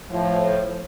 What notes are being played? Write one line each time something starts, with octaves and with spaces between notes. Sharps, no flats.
A2 F3